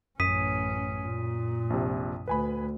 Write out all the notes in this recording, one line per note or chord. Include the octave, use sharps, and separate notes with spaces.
A1 F#2 C#4 D#6 B6 D#7
A#2
A#1 C3
D2 B4 G#5 B5